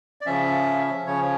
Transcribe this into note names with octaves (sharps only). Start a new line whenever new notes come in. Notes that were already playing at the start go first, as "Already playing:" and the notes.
D5
C#3 F3 C#4 E5
C#3 F3 C#4 C#5